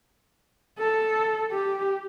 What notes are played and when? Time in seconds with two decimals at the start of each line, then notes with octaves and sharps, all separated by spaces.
0.78 A4
1.51 G4